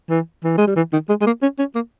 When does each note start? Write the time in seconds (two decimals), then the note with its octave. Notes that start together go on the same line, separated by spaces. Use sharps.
0.10 E3
0.44 E3
0.58 G#3
0.67 G3
0.76 E3
0.93 D#3
1.09 G#3
1.21 G#3
1.26 A#3
1.42 C#4
1.59 C#4
1.75 A#3